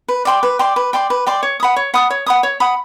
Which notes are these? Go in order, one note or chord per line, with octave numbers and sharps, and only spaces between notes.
B4
D5 G5 C6
B4
D5 G5 C6
B4
D5 G5 C6
B4
D5 G5 C6
C#5
F#5 B5 D#6
C#5
F#5 B5 D#6
C#5
F#5 B5 D#6
C#5
F#5 B5 D#6